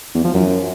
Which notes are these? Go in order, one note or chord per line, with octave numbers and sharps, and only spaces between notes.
E2
F3
F#2